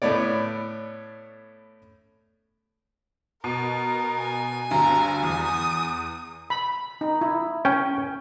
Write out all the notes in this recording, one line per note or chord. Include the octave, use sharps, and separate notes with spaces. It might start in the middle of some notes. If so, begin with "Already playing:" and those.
A2 A3 B3 C#5 D5
B2 A#4
G#5
D2 G2 A#5
E2 D#6
B5
D#4
E4
C#4 G5